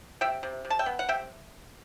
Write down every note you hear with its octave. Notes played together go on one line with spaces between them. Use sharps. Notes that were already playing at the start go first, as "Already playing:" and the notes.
C3 E5 G5
C3
C3
A5
E5 G5
B3
F#5
C3 E5 G5